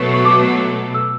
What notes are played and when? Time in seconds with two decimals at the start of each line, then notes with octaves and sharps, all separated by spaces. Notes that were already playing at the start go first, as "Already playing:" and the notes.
Already playing: B2 F#3 A3 A5 C#6
0.14 C#6
0.25 D6
0.94 E6